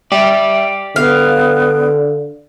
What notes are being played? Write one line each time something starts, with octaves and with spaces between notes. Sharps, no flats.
G4 D5 E5
D3 B3 F5